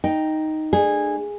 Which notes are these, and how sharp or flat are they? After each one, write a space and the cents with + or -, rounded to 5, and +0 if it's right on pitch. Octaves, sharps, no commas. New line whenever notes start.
D#4 +0 G5 +0
A3 +0 D4 +40 G#4 -15